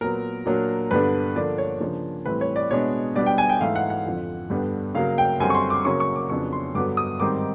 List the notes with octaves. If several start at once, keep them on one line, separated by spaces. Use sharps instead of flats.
A#2 F#3 B3 A#4
A#2 F#3 A#3 D4
G2 D3 G3 B3 D4 B4
D3 F3 A#3 D4 D5
C#5
C#3 F3 A#3 D4
A2 E3 G3 C4 B4
C#5
D5
B2 G#3 B3 D4 C#5
B2 G3 B3 D4 D5
G5
G#5
G5
G#2 E3 A3 F5
F#5
F#5
F2 D3 F3
G2 D3 G3 B3 D4
C#3 F#3 A#3 F5
G5
F#2 D3 G3 C4 G#5
C#6
C6
D6
C#3 F#3 A#3 C#4 C#6
C#6
D6
F2 C#3 F#3 B3 D4 C#6
C6
G2 D3 F#3 B3 D6
D#6
G#2 D#3 G3 C4 D6